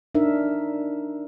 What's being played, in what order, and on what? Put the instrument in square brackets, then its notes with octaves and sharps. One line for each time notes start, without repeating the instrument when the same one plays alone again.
[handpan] D4 D#4 A#4 E5